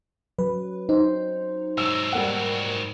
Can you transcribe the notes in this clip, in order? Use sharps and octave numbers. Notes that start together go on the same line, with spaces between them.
F#3 B4
D#4 C5
G#2 F#3 E6
G3 A#3 F#5